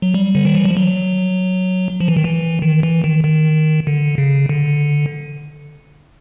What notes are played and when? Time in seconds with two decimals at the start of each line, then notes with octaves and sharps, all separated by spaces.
0.02 F#3
0.14 G3
0.35 D3
0.45 D#3
0.55 E3
0.65 F3
0.77 F#3
2.01 F3
2.08 E3
2.17 D#3
2.24 E3
2.62 D#3
2.83 E3
3.04 D#3
3.24 D#3
3.87 D3
4.18 C#3
4.49 D3